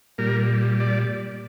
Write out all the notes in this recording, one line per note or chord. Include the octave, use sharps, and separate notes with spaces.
A#2 G3 A#4
D5